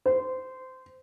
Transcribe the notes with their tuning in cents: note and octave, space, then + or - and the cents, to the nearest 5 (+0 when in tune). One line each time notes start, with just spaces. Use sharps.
C5 -20